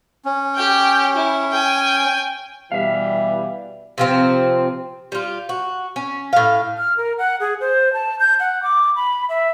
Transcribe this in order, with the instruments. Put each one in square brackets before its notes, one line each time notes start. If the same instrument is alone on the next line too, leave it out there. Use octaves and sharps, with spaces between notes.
[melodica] C#4
[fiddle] G4 G5
E4
G5 G#5
[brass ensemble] B2 E3 G3 [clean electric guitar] E5 F5
[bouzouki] C3 F3 C4
G3 F4
F#4
C#4
A2 F5
[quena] F6
A#4
F#5
G#4
C5
A5
G6
F#5
D6
B5
E5